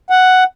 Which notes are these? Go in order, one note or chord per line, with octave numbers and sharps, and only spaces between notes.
F#5